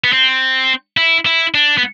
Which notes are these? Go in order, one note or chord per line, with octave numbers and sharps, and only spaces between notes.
B3
C4
E4
E4
D4
B3